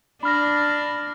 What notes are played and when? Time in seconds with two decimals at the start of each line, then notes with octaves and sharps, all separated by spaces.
0.23 D4 B5 F6 A#6